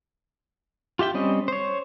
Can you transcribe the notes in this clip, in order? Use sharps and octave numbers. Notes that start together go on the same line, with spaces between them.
F4 G4 E5 G5
G3 C4 C#4 D#5
C5 C#5